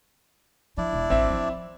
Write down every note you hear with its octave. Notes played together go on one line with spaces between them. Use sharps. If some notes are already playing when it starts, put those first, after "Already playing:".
F3 D4 E4 D5
E1
A1 G2 C4 E5
F3